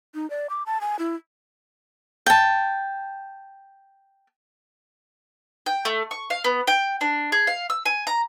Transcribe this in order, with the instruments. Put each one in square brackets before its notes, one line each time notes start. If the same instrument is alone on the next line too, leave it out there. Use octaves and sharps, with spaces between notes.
[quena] D#4
D5
D6
A5
G#5
E4
[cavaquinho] G5 A5
[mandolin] G5
A3
C#6
F5
B3
G5
D4
G#4
F5
E6
G#5
A#5